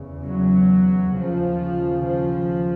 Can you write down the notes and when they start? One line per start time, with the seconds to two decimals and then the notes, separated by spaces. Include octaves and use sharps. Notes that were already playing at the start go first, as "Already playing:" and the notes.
Already playing: E2 C#3
0.23 F#3
1.13 D#2 C#3 F3
2.05 F3